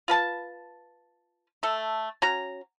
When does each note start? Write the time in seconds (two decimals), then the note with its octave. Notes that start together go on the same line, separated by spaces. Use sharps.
0.08 F4 B4 A5
1.63 A3 A4
2.22 C#4 F#4 A#5